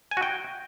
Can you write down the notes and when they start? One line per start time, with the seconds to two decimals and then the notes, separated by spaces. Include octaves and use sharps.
0.11 G#5
0.17 F#4
0.23 G5